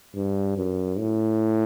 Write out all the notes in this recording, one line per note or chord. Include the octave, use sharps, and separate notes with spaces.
G2
F#2
A2